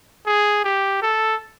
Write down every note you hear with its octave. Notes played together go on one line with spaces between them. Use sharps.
G#4
G4
A4